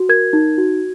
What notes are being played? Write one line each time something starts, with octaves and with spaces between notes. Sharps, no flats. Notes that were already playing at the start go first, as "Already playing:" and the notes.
Already playing: F#4
A#4 G#6
D#4
F#4